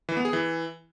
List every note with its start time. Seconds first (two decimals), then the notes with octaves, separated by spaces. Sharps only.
0.09 E3
0.17 B3
0.25 G#4
0.33 E3